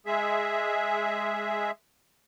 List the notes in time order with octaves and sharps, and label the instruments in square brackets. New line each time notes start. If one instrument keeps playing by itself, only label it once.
[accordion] G#3 G#4 E5